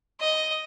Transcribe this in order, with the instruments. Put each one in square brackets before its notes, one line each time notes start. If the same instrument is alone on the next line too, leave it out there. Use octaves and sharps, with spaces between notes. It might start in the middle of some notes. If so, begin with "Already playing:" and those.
[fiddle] D#5